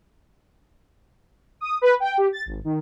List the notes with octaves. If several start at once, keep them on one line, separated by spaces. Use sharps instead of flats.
D#6
B4
G5
G4
A6
G#1
D#3